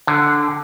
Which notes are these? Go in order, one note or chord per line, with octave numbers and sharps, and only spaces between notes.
D3